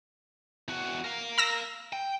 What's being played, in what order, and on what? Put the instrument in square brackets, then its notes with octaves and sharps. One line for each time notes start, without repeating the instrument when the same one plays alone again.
[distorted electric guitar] E2 F#4
A#4 F5
[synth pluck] A#5 E6 A#6
[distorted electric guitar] G5